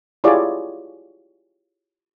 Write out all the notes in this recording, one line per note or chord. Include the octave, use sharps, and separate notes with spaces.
E4 F4 G4 G#4 C#5 D5